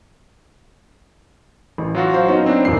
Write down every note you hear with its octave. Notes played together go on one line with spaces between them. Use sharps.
A1
F#3 F4 F#4
C5 F5
B3 C#4 D#4
C4 D4
D#1 F#2 E3 C7